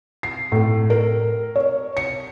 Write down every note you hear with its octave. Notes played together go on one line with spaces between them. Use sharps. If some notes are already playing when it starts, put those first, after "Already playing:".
C7
A2
A#4
C#5
C#7